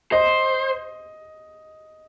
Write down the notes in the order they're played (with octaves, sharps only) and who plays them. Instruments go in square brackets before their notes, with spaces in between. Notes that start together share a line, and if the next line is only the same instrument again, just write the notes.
[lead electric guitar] C5 [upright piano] D#5